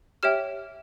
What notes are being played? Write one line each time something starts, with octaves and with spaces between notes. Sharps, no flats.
G4 C#5 E5 G5 F6